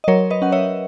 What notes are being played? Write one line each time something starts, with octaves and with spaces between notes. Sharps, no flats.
D#5
F#3 A#4 C#5
B4 D#5
C#4 F#5
C#5 E5